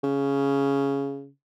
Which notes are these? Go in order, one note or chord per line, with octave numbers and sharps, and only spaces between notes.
C#3